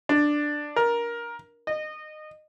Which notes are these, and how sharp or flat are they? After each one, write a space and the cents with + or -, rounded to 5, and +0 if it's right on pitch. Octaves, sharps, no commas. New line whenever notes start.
D4 +5
A#4 +15
D#5 -20